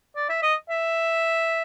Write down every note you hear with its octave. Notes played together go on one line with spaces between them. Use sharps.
D5
E5
D#5
E5